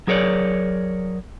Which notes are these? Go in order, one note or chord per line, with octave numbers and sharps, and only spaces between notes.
F#3 G#4 A#4 C#5 D5